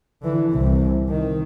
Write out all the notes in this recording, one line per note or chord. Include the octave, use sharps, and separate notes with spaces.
D3 E3
C2 C3
D#3